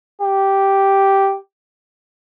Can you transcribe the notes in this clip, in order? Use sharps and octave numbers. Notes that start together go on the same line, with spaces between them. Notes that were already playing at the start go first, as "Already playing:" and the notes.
G4